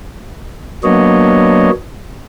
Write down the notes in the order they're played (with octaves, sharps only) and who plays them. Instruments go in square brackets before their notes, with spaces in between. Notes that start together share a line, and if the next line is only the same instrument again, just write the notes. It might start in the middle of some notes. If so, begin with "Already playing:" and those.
[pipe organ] F#3 A#3 B3 D4 C#5 D#5